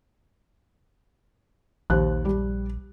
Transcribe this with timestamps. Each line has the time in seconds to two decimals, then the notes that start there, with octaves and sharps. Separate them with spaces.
1.90 A#1 D#2 C5 F#6
2.25 G3